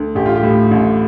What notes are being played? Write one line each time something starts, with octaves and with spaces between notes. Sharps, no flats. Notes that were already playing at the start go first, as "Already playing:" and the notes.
Already playing: D2
A1 G4
F4
G4
A2
A1